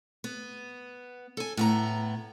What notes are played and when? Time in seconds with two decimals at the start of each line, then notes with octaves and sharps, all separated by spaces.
0.24 B3
1.37 A4 G#5
1.57 A2 B3 A#5